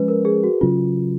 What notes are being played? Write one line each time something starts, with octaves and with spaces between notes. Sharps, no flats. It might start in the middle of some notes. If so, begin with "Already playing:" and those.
Already playing: F3 G#3 C#4 B4
A#4
G#4
F#4
C#3 F#3 C#4 F4